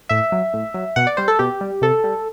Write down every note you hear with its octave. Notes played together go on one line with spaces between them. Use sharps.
A2 E5
F#3
A2
F#3
B2 F#5
D5
G3 C5
A4
B2 G4
G3
C3 A4
G3